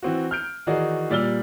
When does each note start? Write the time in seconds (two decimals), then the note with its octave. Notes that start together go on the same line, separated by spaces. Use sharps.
0.03 E3 C4 F#4
0.31 F6 G6 D7
0.67 D#3 E3 D#4 F#4 G#4 D5
1.10 A#2 G3 D5 E6 F6 G7